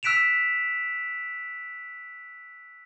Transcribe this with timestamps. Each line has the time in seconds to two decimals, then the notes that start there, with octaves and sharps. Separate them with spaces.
0.03 E6 F#6 B6 D7 E7 F7